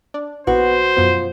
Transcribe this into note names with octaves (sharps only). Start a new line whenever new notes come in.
D4
A#1 B3 F#4 C5
F#2 B2 F3 B3